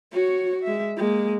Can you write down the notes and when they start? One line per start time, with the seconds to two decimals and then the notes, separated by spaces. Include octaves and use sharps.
0.12 F#4 C#5
0.64 G#3 E5
0.97 G#3 A#3